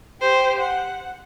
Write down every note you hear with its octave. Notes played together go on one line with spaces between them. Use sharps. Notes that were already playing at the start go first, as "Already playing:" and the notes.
G4 C5
F#5